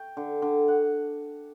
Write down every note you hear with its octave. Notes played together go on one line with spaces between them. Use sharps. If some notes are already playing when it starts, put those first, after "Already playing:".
Already playing: G5
D3
D3
F#5